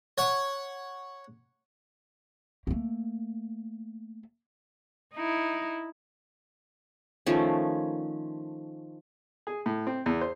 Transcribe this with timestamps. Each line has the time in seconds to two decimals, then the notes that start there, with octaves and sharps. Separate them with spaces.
0.18 C#5 F#5
2.67 A3 A#3
5.14 D#4 E4
7.26 D#3 F3 A3 C#4
9.47 G#4
9.66 A2
9.87 C4
10.06 E2
10.21 C5